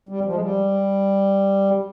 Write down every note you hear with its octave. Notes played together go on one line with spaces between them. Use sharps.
G3
F3
G#3
G3